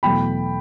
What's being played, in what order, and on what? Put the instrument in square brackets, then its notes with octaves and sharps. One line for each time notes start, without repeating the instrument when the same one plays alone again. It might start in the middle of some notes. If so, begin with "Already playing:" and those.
[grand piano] E2 B2 F#3 A3 G5 B5